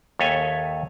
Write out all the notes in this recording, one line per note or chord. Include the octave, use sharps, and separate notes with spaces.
D#2 A4 C#5 E5 G#5